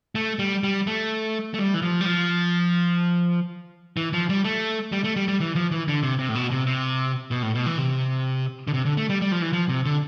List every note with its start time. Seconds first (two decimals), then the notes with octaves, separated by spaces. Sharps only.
0.15 A3
0.39 G3
0.63 G3
0.87 A3
1.54 A3
1.59 G3
1.74 E3
1.82 F3
2.01 G3
2.06 F3
3.97 E3
4.13 F3
4.29 G3
4.44 A3
4.92 G3
5.04 A3
5.16 G3
5.28 G3
5.40 E3
5.55 F3
5.72 E3
5.88 D3
6.03 C3
6.19 C3
6.29 A2
6.35 B2
6.51 C3
6.67 C3
7.31 B2
7.43 A2
7.55 B2
7.66 E3
7.78 C3
8.68 D3
8.73 C3
8.85 D3
8.97 A3
9.09 G3
9.21 G3
9.32 F3
9.42 E3
9.53 F3
9.69 C3
9.85 D3